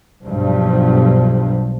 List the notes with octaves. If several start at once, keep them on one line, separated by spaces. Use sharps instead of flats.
B1 G2 F3